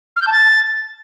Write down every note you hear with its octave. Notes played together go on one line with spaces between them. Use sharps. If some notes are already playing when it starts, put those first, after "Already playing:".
F6
G6
A5
A6